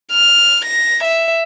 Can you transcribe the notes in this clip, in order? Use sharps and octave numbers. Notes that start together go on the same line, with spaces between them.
F6
A#6
E5